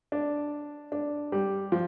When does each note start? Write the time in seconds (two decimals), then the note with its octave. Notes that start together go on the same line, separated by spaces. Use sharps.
0.12 D4
0.92 D4
1.32 G3
1.72 F3